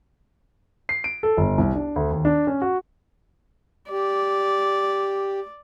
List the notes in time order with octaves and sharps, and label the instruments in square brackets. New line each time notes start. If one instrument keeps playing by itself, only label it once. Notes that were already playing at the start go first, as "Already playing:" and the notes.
[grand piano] C7
D7
A4
G1
C2
D4
D2
D#2
D4
C#4
F#4
[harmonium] G4 [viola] D5